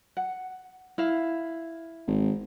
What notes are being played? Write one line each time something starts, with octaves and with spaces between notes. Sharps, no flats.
F#5
E4 F5
G#1